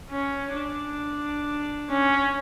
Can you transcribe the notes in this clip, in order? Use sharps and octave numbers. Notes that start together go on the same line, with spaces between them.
C#4
D4
C#4